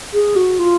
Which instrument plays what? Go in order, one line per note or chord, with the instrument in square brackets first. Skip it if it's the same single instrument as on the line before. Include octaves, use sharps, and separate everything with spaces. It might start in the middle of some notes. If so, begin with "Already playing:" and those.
[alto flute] G#4
F#4
F4